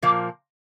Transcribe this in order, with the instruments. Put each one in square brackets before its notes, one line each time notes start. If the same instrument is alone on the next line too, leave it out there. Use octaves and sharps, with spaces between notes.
[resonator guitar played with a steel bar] A#2 F3 A#3